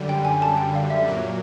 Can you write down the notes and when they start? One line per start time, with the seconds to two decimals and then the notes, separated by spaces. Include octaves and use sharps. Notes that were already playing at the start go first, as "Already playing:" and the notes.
Already playing: F#2 D3 G3
0.09 G5
0.25 G#5
0.42 A5
0.58 G5
0.75 F5
0.90 E5
1.07 A#2 F#3 A#3